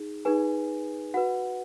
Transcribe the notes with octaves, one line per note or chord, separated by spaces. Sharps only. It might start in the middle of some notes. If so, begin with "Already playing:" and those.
Already playing: D#4 G#4
D#4 G#4 B4 G#5
F#4 B4 F#5